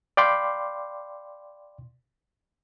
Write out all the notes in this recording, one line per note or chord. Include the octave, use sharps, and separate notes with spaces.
D5 F5 G5 B5 C6 D6